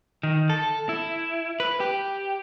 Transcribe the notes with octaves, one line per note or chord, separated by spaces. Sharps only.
D#3
A4
E4
B4
G4